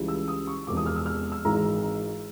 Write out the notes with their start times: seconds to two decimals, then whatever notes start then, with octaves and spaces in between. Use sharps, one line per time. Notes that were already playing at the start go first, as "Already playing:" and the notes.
Already playing: C#2 C#3 E3 G3
0.08 E6
0.28 D#6
0.47 C#6
0.67 E1 E2 C3 F3 D6
0.77 D#6
0.86 F6
0.96 E6
1.06 F6
1.32 E6
1.45 G#1 G#2 E3 G#3 A#5